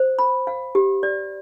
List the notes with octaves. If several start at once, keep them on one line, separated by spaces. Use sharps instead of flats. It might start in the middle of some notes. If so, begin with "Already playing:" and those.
Already playing: C5
B5
F5
G4
D5